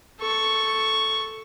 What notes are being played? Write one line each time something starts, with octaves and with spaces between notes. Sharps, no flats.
A4 C#6